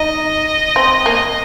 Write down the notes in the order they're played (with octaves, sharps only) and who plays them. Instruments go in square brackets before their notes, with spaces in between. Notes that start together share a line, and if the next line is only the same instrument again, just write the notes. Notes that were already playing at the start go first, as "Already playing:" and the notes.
Already playing: [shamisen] D#4 [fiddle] D#5
[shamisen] C4
A#3